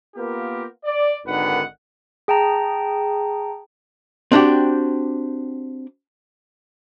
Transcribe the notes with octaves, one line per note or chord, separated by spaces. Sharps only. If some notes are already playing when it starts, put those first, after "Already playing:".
A#3 B3 F4 G4 A#4
D5
G#1 D3 D#3 B4 F#5
G#4 G5 A5 A#5
C4 D4 F#4 G4